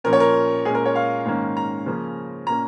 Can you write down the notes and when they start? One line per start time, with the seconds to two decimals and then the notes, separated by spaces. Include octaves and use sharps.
0.04 A#2 F3 C#4 A#4
0.13 C#5
0.20 A#4
0.65 A#2 G#3 C#4 G#4
0.75 A#4
0.85 C#5
0.95 F5
1.26 G#2 D#3 A#3 C#4
1.57 A#5
1.86 C#3 F3 A#3 C#4
2.47 A#2 A#3 C#4 A#5